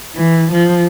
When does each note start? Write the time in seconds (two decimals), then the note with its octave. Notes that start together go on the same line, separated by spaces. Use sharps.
0.15 E3
0.52 F3